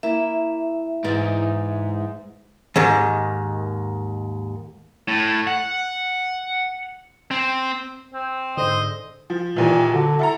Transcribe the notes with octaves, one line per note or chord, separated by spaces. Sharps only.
A#3 E4 E5
G#2 E3 D5
D#2 G#2 D#3
A2
F#5
C4
C4
G#2 D3 C5 D#5
F3
D#2 A#2 E3
D3 F#3
E4 A4 A#5